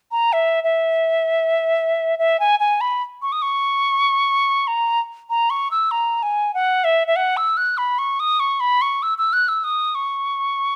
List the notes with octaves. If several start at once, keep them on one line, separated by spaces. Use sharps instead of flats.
A#5
E5
E5
E5
G#5
G#5
B5
C#6
D#6
C#6
A#5
A#5
C#6
E6
A#5
G#5
F#5
E5
E5
F#5
E6
F#6
B5
C#6
D#6
C#6
B5
C#6
E6
E6
F#6
E6
D#6
C#6